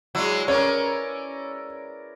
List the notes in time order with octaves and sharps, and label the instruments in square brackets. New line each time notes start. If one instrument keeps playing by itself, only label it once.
[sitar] F#3 G#3 [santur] E4 D5
[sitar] C#4 [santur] A#4 B4 D5 [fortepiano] C#5